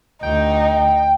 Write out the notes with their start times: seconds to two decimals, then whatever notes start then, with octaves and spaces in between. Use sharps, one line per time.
0.23 D2 D#4 G5